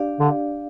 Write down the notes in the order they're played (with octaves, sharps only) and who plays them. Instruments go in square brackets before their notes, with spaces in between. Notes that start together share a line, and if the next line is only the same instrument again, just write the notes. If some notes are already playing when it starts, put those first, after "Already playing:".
Already playing: [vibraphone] D4 G4 D5 F5
[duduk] D3